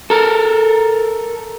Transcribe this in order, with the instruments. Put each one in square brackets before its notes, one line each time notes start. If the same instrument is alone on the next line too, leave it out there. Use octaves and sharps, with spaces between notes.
[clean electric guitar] A4 A#4